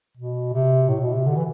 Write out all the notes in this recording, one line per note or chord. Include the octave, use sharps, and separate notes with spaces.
B2
C3
A2
B2
C3
D3
E3